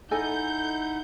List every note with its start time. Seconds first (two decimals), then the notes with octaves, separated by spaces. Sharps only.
0.11 D#4 E4 A4 D#5 F#5 G#5 G6